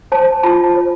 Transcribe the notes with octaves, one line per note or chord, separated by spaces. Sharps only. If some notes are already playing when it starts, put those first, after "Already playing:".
C5 A5
F4 A5
C5